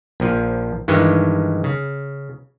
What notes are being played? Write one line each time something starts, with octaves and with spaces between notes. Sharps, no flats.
A#1 F3
G2 D#3 E3 G#3
C#3